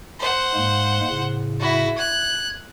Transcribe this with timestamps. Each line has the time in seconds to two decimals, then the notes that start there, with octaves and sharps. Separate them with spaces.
0.19 C5 F#5
0.55 G#2 G#3 A#3
1.10 A2 C#3
1.59 E4 F#4
1.97 F#6 G#6